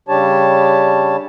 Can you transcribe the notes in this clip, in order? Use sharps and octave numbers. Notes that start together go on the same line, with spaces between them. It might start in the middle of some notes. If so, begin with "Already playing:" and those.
C#3 G3 D4 G4 C#5 A5